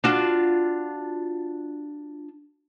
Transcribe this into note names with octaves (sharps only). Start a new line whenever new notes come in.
D4 F4 F#4